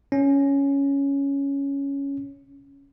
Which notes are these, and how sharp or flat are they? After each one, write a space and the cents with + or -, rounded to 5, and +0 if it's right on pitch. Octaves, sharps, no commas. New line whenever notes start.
C#4 +5